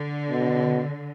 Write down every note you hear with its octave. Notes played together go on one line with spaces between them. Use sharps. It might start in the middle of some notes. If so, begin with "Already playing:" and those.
Already playing: D3
B2